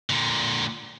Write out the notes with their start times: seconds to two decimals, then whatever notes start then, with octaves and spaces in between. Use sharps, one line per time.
0.10 A#2 D3